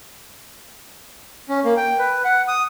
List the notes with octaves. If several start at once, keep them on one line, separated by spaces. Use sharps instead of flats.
C#4
A#3
G5
B4
F#5
D#6